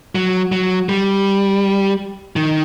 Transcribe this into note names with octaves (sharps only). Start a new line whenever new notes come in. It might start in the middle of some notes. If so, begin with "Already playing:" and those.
F#3
F#3
G3
D#3